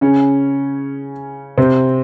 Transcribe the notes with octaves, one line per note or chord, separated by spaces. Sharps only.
C#3 C#4
C3 C4